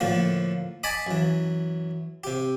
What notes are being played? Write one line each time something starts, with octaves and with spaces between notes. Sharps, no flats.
A2 D3 F3 A#3
D#5 G#5 A5 B5 D6 D#6
F#2 E3
C3 G4